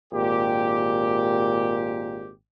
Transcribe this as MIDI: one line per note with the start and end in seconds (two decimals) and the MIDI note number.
0.12 2.32 32
0.12 2.32 46
0.12 2.32 67